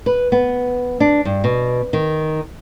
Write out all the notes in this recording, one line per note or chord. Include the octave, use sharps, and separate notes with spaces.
B4
B3
D4
G2
B2
D#3